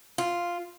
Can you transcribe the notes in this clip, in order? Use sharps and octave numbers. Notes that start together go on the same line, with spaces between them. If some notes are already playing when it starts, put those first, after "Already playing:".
F4